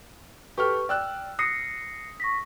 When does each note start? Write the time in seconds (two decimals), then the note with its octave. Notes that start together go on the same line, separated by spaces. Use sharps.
0.58 G4 A4 B4 C#6 F6
0.89 D5 G5 E6 F#6
1.39 D#6 A#6 C7 C#7
2.20 C#6 A#6 B6